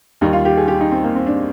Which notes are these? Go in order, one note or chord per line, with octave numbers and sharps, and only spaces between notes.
D#2 D#3 G3 D#4
F4
G4
G#4
G4
D#4
C4
A#3
C4
D4